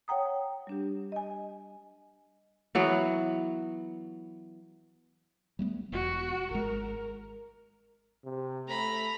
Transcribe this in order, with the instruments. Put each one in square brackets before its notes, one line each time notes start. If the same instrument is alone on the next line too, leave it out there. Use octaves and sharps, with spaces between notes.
[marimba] C#5 F#5 G5 A#5 D#6
G3 D4 G4
D#5 G#5
[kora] E3 F#3 B3
[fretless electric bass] G3 A3 B3
[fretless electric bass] E1 [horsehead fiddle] F#4
[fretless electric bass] G#1 G#3 [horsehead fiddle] A#4
[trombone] C3
[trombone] A3 [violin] A#5 B5